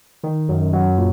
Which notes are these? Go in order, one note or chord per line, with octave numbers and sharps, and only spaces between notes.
D#3
F#2
F#3
A#2